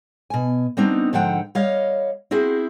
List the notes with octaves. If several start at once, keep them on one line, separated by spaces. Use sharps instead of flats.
B2 G#5
G3 B3 C4 D4 D#4
G#2 D3 F3 C5 F#5 G5
G3 C#5 D#5 F5
C4 E4 F#4 G#4 C5